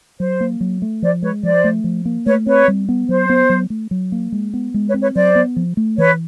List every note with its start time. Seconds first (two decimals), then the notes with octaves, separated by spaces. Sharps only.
0.20 F#3 C5
0.41 A#3
0.61 F#3
0.82 A3
1.02 F3 C5 D5
1.23 G#3 B4 C#5
1.43 F3 C5 D5
1.64 A3
1.84 F3
2.05 A#3
2.26 A3 B4 C#5
2.46 C4 B4 C#5
2.68 G3
2.89 B3
3.08 F#3 C5
3.30 B3
3.50 F#3
3.70 A3
3.91 F#3
4.12 A#3
4.32 G#3
4.54 B3
4.74 G#3
4.88 B4 C#5
4.94 C4
5.01 B4 C#5
5.15 F#3 C5 D5
5.35 B3
5.56 F3
5.77 A3
5.98 E3 B4 C#5